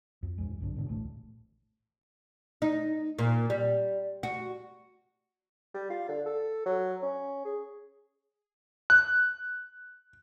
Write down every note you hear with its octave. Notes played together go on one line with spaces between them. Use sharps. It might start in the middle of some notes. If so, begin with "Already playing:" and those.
F2
D#1 F2 G#3
B1 G2 D3
G#2 B2 D3
D#1 A1 A3
D#4
A#2
G3
F#4
G3
F4
D3
A4
F#3
C#4
G#4
F#6